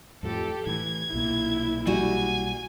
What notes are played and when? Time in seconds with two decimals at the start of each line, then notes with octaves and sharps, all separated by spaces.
0.23 F2 A2 F3 G4 A4
0.66 A2 E3 G#6
1.13 B1 A#2 A#3 E4
1.87 G3 F#4 G#5